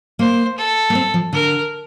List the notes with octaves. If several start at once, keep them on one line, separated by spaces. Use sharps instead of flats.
A#3 C5
A4
A#3
C4
F3
D3 A#4